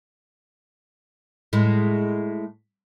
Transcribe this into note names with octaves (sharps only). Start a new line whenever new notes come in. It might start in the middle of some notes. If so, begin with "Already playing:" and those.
A2 G#3